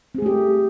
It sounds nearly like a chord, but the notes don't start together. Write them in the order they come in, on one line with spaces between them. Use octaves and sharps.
C4 G#4 A3 G4